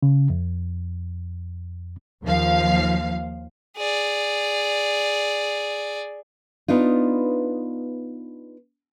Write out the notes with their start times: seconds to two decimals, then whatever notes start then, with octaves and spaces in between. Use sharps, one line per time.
0.03 C#3
0.30 F2
2.23 D#2 F3 F5
3.77 G#4 D5
6.68 B3 D4 D#4 F4